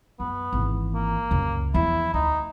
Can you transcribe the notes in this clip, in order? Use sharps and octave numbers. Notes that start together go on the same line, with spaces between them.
F#2 B3
G#1 E3
A#3
C#2 F#2
E2 F3 E4
D2 D#4